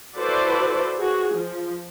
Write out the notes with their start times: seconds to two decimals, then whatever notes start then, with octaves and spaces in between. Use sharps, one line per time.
0.17 E4 F#4 A4 B4 C5 D5
0.98 F#4 G#4
1.35 F3